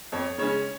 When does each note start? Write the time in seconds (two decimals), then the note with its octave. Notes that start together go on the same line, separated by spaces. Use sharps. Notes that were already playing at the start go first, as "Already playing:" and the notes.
0.12 F2 C#5
0.38 C#3 G#3 C#4 C#5